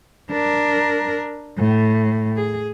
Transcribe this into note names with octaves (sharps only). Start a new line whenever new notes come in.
D4 A#4
A2
G#4